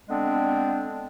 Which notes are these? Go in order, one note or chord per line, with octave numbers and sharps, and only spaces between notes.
D3 G#3 B3 C4 D4